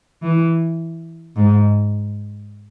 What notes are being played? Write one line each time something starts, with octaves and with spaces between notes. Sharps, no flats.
E3
G#2